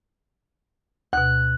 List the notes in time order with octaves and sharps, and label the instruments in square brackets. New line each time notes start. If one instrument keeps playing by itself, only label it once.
[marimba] D2 B2 [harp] F#6